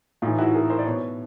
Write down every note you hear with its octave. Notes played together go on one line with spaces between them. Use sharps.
A2 E3 D#4 F4
E4 F#4
G#4 A#4
A#4 C5
D5
B2 B4 C#5